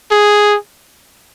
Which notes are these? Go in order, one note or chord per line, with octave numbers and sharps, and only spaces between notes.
G#4